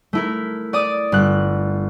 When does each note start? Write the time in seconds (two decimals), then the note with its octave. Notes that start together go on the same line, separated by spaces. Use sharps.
0.13 A3 E4 A#4
0.73 D5 D6 D#6
1.12 G1 F#6